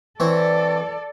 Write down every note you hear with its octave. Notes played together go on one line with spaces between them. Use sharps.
E3 C4 A4 C#5 D5